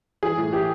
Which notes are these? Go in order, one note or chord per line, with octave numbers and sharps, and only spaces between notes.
E3 G#4
A2
E3 G4